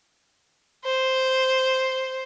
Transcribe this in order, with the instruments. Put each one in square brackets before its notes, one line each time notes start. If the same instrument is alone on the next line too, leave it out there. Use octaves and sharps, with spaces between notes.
[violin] C5